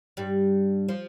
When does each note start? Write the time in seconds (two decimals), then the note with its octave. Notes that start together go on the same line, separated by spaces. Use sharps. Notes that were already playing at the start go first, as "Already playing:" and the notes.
0.17 G2 G3
0.89 F3